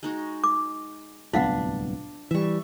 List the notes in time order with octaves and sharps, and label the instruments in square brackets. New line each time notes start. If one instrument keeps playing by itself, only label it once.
[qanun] G#3 D#4 F#4
[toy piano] D6
[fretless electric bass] D1 C2 B3 [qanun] D4 [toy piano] F4 F5 F#5
[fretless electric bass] E3 G3 [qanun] E5 C#6